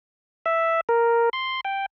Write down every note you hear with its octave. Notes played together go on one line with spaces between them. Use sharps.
E5
A#4
C6
G5